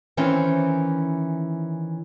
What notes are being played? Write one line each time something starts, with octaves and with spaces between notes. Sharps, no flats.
D#3 E3 C4 C#4 C5